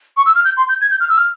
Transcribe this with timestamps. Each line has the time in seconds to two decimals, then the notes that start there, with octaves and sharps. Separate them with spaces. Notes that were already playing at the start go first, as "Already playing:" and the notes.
0.17 C#6
0.26 E6
0.35 F6
0.45 G6
0.57 C6
0.69 G6
0.81 G#6
0.91 G6
1.00 F6
1.09 E6
1.17 F6